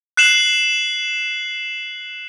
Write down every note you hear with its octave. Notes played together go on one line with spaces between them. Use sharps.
F#6 C7 E7 F#7